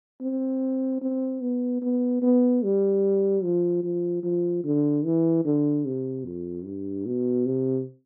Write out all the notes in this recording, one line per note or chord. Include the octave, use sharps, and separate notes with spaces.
C4
C4
B3
B3
B3
G3
F3
F3
F3
D3
E3
D3
C3
F2
G2
B2
C3